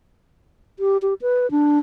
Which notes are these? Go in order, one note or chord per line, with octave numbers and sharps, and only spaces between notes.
G4
G4
B4
D4